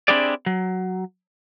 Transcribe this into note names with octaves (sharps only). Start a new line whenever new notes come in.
C4 D4 E4 G4 G#4 D5
F#3